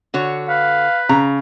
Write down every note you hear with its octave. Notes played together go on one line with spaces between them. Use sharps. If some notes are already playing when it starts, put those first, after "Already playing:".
D3 F#4 C#5
B4 F5
C#3 A#5